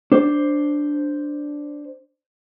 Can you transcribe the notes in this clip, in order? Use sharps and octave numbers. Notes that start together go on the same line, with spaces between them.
D4 C5